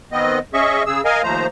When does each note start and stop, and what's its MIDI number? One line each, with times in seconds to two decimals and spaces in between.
0.12 0.39 51
0.12 0.39 59
0.12 0.39 60
0.12 0.39 75
0.54 0.83 61
0.54 0.83 68
0.54 0.83 75
0.54 0.83 76
0.54 0.83 85
0.86 1.01 49
0.86 1.01 68
0.86 1.01 88
1.05 1.22 70
1.05 1.22 75
1.05 1.22 77
1.05 1.22 80
1.23 1.47 39
1.23 1.47 53
1.23 1.47 57
1.23 1.47 72
1.23 1.47 82